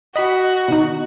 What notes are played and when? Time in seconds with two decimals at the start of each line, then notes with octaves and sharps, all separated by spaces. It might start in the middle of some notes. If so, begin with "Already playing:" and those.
0.16 F#4 D#5 B5
0.68 B2 D#3 D#4